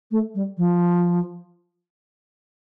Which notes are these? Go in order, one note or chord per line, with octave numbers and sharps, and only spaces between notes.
A3
G3
F3